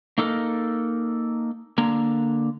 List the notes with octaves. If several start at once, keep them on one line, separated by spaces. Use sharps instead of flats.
A#3 D#4 A4 A#4
D3 A#3 A#5